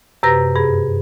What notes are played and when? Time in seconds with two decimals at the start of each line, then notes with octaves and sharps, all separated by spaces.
0.23 F#2 C3 G4 B4 A#6
0.56 G2 G#4